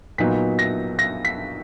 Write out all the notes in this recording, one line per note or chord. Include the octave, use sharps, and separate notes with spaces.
A#2 F#3 B3 D#4 B6
A#6
A#6
B6